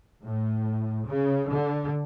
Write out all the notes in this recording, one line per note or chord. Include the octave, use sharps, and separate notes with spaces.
A2
C#3
D3